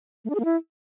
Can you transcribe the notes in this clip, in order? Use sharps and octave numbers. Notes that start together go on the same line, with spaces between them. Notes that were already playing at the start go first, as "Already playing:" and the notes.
A3
D4
G#4
A#3
E4